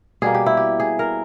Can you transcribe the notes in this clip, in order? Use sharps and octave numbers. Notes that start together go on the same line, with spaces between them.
B2 G3 A#3 G#4
G4
E4
G4
G#4
A#4